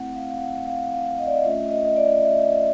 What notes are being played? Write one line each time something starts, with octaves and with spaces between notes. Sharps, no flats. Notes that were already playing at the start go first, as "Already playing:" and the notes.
Already playing: A3 C4 E4 F#5
F5
F5
F#5
F5
F5
D#5
D5
D#5
A3 C#4 F4 E5
D#5
D#5
D5
E5
E5